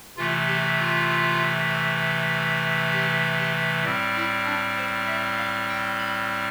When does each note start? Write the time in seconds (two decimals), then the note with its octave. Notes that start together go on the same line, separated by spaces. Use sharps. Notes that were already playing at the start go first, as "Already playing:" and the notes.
0.17 C3 E3 A3 F4
0.48 G4
0.78 F4
2.93 G4
3.39 G4
3.84 A2 G3 C4
4.15 E4
4.46 D4
4.76 C5
5.07 E5
5.37 F5
5.68 G5
5.98 B5